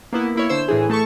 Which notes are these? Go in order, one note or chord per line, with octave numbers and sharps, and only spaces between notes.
A#3 B3 E4
A#3 E4 C#5
D3 C5 E6
A2 E3 G#4
A3 A4 A5 C#6